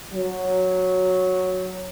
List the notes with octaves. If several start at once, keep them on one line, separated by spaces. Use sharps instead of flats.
F#3